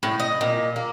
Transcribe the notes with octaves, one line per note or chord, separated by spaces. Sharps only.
A2
D#5
A#2
A#3